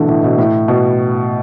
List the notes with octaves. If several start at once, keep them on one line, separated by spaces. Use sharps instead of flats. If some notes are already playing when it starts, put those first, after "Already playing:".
Already playing: B2 D3 E3 A3
A2
B2
A2
B2